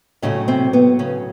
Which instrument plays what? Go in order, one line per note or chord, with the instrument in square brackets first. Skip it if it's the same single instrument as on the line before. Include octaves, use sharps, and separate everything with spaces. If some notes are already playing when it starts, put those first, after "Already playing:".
[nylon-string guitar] A2 C#3 F#3 A3 C#4
C3 C4
B3
C#3 C#4